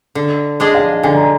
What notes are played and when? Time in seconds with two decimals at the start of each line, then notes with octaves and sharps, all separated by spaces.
0.15 D3
0.60 G#3 D4 G#4 D#5
0.75 F5
1.03 D3 G#5
1.15 A#5